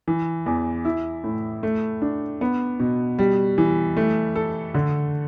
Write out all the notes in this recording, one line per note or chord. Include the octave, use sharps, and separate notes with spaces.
E3
E2
E4
A2
A3
D4
B3
B2
G3
E3
A3
A4
D3